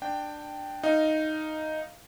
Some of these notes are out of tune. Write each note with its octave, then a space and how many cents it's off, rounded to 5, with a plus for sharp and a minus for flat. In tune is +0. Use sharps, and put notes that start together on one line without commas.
D4 +15 G5 +0
D#4 +0 F5 -10